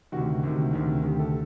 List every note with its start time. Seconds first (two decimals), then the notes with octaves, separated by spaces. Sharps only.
0.12 D2 C3 D#3 F#4
0.43 D2 C3 D#3
0.73 D2 C3 D#3
1.03 D2 C3 D#3 G4
1.19 A4